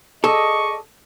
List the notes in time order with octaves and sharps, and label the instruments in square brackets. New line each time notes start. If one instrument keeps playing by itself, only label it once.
[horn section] G#4 D5 D#5 [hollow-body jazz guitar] A4 [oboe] C#6